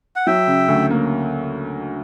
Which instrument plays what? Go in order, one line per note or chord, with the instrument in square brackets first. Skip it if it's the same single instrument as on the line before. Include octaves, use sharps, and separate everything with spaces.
[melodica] F#5
[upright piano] F#3 [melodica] E5 G5
[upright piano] C#3
D2
A#3